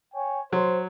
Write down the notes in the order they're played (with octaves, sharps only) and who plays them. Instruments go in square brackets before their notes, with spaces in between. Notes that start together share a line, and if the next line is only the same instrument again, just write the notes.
[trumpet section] C#5 G5 G#5
[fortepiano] F#3 [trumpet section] C5